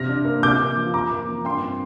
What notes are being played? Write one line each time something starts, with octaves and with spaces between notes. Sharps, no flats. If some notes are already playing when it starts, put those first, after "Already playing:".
Already playing: C3 F6 A#6
D4
A#3
C3 D6 G6
A#3
F3
F2 A#5 D6
A#3
F3
G2 G5 C6
C4